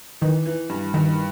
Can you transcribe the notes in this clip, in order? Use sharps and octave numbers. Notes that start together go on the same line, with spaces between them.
D#3 E3
E3
G2
G2 D#3